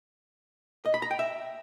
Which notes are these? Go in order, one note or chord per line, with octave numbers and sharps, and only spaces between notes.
D#5
B5
A#5
G5
E5